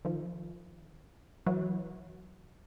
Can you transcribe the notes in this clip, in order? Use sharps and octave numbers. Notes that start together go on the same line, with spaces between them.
D#3 F3
E3 F#3